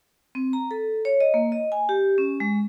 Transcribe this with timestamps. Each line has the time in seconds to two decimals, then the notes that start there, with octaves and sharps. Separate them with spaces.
0.35 C4
0.53 A#5
0.71 A4
1.05 C#5
1.20 D#5
1.34 A#3
1.52 D#5
1.72 G#5
1.89 G4
2.18 C#4
2.40 G#3